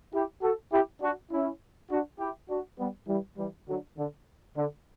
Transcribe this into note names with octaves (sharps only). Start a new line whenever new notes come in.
E4 G4
F#4 A4
E4 G4
D4 F#4
C#4 E4
D4 F#4
E4 G4
D4 F#4
G3 B3
E3 G3
E3 G3
D3 F#3
D3
D3